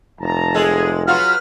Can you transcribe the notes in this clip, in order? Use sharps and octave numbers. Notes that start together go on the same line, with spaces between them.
F1 A5 A#5
G#3 G#4 A4
F#3 F4 F#4 B4 F6